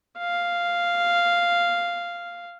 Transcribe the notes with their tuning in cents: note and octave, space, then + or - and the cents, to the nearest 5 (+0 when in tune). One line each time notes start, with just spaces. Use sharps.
F5 -5